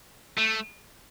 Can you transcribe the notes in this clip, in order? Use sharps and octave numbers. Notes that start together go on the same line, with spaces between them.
A3